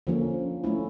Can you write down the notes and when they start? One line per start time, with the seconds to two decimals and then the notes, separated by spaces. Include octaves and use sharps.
0.07 D3 F3 A#3 C#4
0.64 A3 C#4 E4